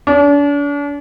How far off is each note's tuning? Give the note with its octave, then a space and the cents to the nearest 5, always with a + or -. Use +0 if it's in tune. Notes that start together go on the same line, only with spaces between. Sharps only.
D4 -40